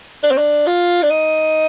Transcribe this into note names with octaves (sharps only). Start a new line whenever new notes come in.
D4
C4
D4
F4
D4
D#4